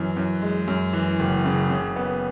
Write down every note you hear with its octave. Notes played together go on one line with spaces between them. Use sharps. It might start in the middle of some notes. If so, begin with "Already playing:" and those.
Already playing: F#2 E3
F#2
G#3
F#2
E3
F#1
C#3
C#3
B3